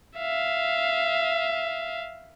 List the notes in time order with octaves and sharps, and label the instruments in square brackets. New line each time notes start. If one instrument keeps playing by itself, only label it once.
[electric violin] E5 F5